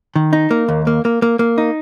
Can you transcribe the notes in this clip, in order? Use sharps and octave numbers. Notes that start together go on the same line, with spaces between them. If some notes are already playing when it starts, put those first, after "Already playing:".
D#3
D#4
A#3
D#2
A#3
A#3
A#3
A#3
D#4